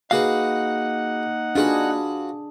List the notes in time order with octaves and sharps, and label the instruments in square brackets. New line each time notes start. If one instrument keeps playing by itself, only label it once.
[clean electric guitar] A#3 F5 [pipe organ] D#4 F#5 [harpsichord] F#4 G#4 B4
[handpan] D4 G#4 [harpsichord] F4 F#4 B4